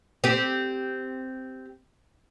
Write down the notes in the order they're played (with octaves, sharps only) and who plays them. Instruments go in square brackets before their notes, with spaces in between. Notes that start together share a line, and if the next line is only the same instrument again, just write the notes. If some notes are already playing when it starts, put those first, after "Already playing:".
[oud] C4 G4